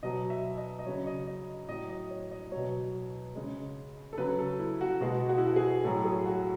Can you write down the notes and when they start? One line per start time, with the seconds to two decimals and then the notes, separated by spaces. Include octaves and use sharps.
0.03 B2 F#3 D#5
0.30 E5
0.58 D#5
0.79 D#5
0.86 C#3 F#3 C#5
1.07 D#5
1.27 D#5
1.68 A2 F#3 D#5
1.89 D#5
2.10 C#5
2.32 D#5
2.51 B2 F#3 C#5
3.36 C#3 G#3
4.13 A4
4.18 C#3 F#3 B4
4.39 A4
4.59 E4
4.81 F#4
5.01 B2 G#3 F#4
5.29 F#4
5.38 E4
5.47 F#4
5.56 G#4
5.84 A2 F#3 A4
6.05 G#4
6.26 F#4